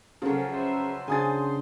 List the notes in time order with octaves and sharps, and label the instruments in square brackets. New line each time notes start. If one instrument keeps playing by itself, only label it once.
[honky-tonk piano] C#3 [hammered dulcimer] F3 F#3 [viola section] A4 A#4
[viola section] B4 C5 E5
[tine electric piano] C#3 C#4 D4 [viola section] C5 [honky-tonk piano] G#5 D#6 A6